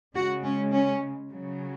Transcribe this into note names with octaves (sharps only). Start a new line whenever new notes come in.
C#3 G#3 F#4
C#4
C#4
C#3 F#3